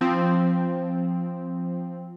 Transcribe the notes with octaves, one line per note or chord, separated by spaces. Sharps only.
F3 C4